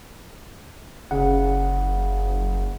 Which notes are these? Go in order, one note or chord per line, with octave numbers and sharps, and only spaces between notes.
F#1 C#3 F#5